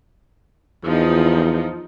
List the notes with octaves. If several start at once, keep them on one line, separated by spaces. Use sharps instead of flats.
E2 F3 D#4